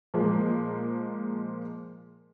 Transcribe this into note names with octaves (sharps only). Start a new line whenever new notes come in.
A#2 F3 G#3 A#3